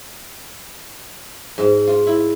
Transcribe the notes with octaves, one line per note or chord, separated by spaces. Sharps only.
G#2
F4
E4